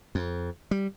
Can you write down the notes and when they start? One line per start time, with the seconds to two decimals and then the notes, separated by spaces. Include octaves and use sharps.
0.15 F2
0.71 G3